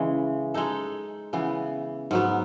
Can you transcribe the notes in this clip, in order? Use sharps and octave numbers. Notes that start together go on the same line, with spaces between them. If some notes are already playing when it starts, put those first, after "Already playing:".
Already playing: C#3 E3 G#3
G#3 D#4 A4
C#3 E3 B3
G#2 F#3 B3